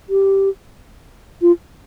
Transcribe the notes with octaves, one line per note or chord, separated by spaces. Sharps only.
G4
F4